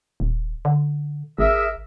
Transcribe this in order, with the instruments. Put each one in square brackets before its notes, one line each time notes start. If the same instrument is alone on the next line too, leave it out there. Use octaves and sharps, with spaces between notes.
[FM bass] D#1
D3
[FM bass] G#1 [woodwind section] G#4 A#4 E5